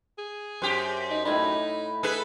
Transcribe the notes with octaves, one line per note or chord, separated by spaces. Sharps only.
G#4
F#2 G4 C5
D#4
A2 D#4 E4 B5
G#4 A4 B4